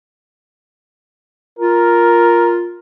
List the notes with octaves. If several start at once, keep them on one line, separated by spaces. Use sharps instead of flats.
F4 A#4